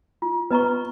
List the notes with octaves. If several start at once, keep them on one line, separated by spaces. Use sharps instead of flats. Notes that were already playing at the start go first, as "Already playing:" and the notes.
F4
B3 B4 D#5 A#5 C#6